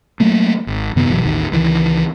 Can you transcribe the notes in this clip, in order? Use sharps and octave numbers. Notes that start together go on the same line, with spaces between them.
F#3 A3 A#3
G#1
F#2 C3 D#3 B3
G1 B2 E3 F#3
A1 D#2 D#3
C#2 D#3 E3